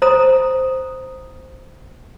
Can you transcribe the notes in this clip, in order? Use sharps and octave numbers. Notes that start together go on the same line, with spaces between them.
C5 A#5 D#6